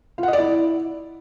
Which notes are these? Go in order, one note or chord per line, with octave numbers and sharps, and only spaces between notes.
F4
F#5
D#5
D5
E4